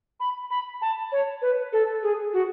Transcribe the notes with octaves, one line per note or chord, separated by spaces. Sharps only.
B5
B5
A5
C#5
B4
A4
G#4
F#4